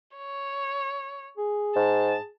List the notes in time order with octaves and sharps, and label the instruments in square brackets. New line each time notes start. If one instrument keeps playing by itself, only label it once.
[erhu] C#5
[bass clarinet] G#4
[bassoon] G#2 [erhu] A5